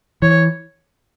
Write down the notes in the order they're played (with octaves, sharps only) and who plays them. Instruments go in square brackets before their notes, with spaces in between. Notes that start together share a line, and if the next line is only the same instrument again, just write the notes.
[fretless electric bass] E3 [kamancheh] C#5